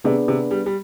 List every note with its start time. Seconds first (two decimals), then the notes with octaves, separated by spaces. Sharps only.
0.04 C3 B3 D4 G#4 D5
0.28 C3
0.51 G3
0.66 G3